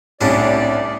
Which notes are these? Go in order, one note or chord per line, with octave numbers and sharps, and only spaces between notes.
C2 A2 C#4 D4 D5